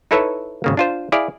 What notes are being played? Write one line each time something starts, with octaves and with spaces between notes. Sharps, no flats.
D#4 E4 A4 B4 C#5 E5
G#1 C#3 A#3
D4 F4 C5
E4 G#4 D5 F5